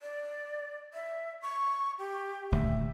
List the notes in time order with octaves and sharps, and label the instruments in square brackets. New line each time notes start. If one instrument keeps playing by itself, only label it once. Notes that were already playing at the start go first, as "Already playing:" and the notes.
[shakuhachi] D5
E5
C#6
G4
[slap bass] D#1 D2 [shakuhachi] E5